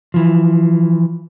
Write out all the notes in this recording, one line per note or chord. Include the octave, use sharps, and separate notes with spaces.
E3 F3